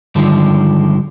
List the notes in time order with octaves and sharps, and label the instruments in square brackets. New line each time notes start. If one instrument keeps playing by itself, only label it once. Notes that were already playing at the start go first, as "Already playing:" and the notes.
[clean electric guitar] G2 D3 D#3 F3 G#3